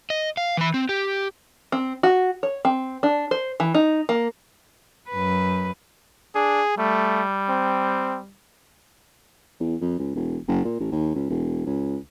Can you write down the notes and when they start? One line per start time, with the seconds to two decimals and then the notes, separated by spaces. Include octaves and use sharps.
0.10 D#5
0.37 F5
0.57 E3 B5
0.74 C4
0.89 G4
1.72 C4
2.03 F#4
2.43 C#5
2.65 C4
3.03 D4
3.31 C5
3.60 E3
3.74 D#4
4.09 A#3
5.10 F#2 B4
6.35 D4 G#4
6.78 G3 A3
7.49 C4
9.60 E2
9.81 F2
9.99 C#2
10.15 E1
10.48 F#1
10.65 A#2
10.80 A1
10.92 D#2
11.15 C#2
11.30 E1
11.66 C#2